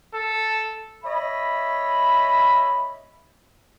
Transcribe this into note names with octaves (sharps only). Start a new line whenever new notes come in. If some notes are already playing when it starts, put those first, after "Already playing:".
A4
C#5 D#5 E5 B5